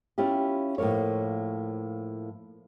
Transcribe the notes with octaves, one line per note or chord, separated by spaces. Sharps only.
C#4 E4 F4 G4
A2 F3 F#3 A#3 C#5